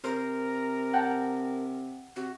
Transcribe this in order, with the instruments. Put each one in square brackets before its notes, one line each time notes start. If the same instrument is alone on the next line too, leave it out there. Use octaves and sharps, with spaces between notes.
[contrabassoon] C3 [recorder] A#4 [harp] C5
[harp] F#5 G5 A5
[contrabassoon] C3 [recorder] F#4